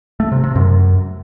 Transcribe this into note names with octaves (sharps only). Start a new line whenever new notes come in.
A3
C3
C3
F#2